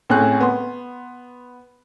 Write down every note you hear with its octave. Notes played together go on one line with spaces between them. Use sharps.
A2 C4 C#4 G#4 F#6
B3 C6